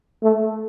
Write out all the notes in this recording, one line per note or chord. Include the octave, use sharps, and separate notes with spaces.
A3